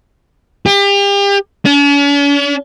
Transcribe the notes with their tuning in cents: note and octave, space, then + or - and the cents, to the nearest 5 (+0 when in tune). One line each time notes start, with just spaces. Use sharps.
G4 +35
C#4 +45